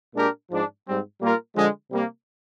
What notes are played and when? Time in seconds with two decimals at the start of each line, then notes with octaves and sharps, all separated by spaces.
0.15 A#2 G#3 D4 G4 A#4
0.50 G#2 F3 G#3 D4
0.85 G#2 G3 C4
1.21 A#2 G3 A#3 F4 A#4
1.55 D3 F3 G#3
1.90 C3 G3 A#3